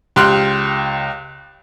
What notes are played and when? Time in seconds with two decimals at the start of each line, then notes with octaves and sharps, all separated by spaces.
0.16 C#2 G4 G5 C6 F6 F#6